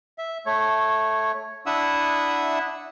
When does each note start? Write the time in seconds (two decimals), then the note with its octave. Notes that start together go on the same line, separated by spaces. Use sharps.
0.18 E5
0.46 A3 C#5
1.66 D4 E4 E5 F#5 D#6 E6